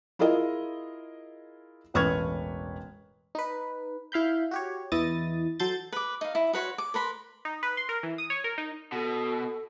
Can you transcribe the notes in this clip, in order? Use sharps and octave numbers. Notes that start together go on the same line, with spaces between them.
E4 F4 G#4 A#4 D#5
E1 A1 B4 C#6 F6 G#6
D#4 B4
E4 F5 B5 G6
F#4 G4 C#5
E2 E3 E4 D#5 D#6 A6
F#3 A4 C6 G6 A6
B4 D6
D#4 F5
E4
F#4 B4 C#5 C6
D6
A#4 B4 B5 C6
D#4
B4
C6
A#4
E3
D#6
C#5
A#4
D#4
B2 A4